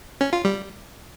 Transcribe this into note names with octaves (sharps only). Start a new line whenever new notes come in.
C#4
F4
G3